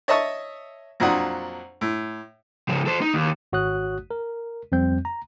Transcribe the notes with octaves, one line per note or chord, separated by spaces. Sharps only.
C#5 D#5 E5 A5 C#6 D#6
F2 A#2 F#3 D4 F#5 D#6
A2
C#3 F3
A4 C5
D#4
D#2
G#1 F#4 C#5 D#6 F#6
A#4
F2 G3 C4 G6
A#5